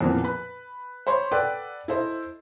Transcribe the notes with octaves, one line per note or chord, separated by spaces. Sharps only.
F2 A#2 E3 F3 A#3 B3
B4 B5
C5 C#5 B5 C6
A4 B4 D5 F#5 G5
E4 A4 C5 D#5